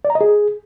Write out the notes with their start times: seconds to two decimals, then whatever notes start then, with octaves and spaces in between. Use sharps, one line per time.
0.05 D5
0.10 A#5
0.15 D#5
0.21 G#4